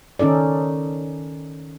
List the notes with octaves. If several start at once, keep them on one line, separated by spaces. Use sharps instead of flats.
D#3 C#4 D#4 A4 D5